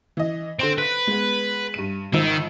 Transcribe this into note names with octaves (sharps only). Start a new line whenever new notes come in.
E3 D#5
D3 C4 C6 D7
B4 F#6 B6
G#3 B3
G2 D#7
G#1 D#3 F3 E6